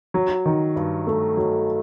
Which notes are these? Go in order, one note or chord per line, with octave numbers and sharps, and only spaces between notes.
F#3
D#3
G2
A3
F#3